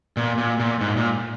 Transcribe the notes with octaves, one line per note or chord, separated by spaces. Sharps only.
A#2
A#2
A#2
G#2
A#2